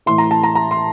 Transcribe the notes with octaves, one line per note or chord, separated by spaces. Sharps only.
A2 E3 C6
A#5
A5
A#5
A#5
C6